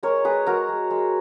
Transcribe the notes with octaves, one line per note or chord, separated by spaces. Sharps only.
G#3 A#4 C#5
G#3 G#4 B4
G#3 F#4 A#4
G#3
G#3